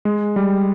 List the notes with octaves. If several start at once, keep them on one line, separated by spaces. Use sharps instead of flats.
G#3
G3